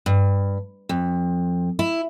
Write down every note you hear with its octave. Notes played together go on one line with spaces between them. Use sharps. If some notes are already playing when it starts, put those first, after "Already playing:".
G2
F2
E4